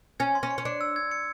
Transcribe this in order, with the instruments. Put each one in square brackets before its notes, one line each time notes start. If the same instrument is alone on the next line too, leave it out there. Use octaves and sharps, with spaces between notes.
[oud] C#4 [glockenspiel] G#6
[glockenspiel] C6
[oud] C#4
[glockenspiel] C#7
[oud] C#4
[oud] D4 [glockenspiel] C#7
[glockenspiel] E6
G#6
C#7